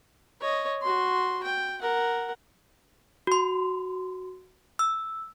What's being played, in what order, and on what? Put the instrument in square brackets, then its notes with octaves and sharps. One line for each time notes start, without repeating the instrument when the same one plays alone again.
[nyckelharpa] C#5 D#5
F#4 C6
G5
A#4 F#5
[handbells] F#4 C6
E6